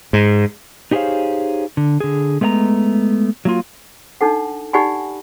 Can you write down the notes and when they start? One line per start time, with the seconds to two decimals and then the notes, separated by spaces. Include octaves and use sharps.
0.13 G#2
0.91 D#4 G4 G#4 C5 C#5 F5
1.77 D3
2.00 D3 G#4
2.41 G#3 A3 B3 F5 A#5
3.45 F#3 A#3 F4
4.21 D4 D#4 A4 F#5
4.73 D#4 G4 D5 F#5 G#5 B5